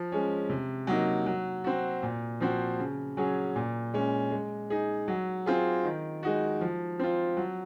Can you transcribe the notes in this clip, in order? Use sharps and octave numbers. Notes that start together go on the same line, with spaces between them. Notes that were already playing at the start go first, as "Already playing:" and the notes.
Already playing: F3
G#3 C#4
C3
F#3 A#3 D#4
F#3
C4 F#4
A#2
F3 C4 F#4
C#3
F#3 C#4 G#4
A#2
G#3 C#4
G#3
D#4 G#4
F#3
C4 F4 G#4
D#3
G#3 D#4 F#4
F3
C4 F4
F#3